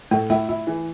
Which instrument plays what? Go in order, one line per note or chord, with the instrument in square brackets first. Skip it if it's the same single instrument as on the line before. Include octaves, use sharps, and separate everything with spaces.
[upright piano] A2 [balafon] A3
[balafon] A3 [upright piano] E4
[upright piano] E4
E3